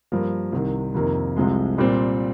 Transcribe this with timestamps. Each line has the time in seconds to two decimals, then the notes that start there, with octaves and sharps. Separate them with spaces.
0.12 G2 F3 A#3
0.52 C2 C3 D#3
0.94 F2 C3 D#3 A#3
1.37 C2 C3 F3 G#3
1.78 A#2 G3 C4